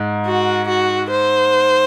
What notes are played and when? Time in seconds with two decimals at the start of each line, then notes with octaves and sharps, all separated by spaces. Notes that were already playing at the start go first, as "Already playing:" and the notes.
Already playing: G#2
0.26 F#4
0.68 F#4
1.10 C5